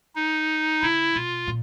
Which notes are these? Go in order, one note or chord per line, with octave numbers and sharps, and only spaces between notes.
D#4
C#3 E4
B2 F4
A#2